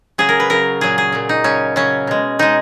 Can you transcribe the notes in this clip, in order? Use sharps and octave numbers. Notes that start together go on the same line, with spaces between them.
C#3 F#3 G#4
A#4
B4
C#3 F#3 A#4
A#2 F#3 G#4
G#4
A#2 F#3
D#4
C#3 F#3 C#4
C#3 F#3 C#4
B2 G#3
B2 G#3 D#4